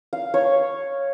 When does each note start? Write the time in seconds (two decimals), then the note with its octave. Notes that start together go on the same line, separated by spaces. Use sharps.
0.13 F5
0.34 C#5